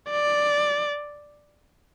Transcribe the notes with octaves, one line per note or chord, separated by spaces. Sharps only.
D5